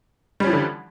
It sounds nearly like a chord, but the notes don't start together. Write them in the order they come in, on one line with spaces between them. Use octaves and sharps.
G3 C#4 F3 E3 D3